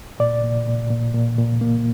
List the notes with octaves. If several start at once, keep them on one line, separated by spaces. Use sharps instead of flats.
A#2 D5
A#2
A#2
A#2
A#2
A#2
A#3